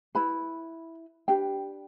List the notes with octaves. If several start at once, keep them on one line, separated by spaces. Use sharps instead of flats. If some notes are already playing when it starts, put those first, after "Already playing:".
E4 B4 B5
D4 G4 B4 G5